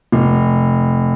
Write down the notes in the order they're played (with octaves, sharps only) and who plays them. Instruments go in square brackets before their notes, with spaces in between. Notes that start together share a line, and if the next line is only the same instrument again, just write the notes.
[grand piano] F1